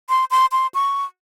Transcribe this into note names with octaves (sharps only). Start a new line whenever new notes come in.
C6
C6
C6
C#6